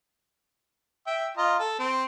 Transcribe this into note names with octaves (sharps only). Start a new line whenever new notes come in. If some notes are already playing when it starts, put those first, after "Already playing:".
E5 G5
F4 D#5 A#5
A4
C4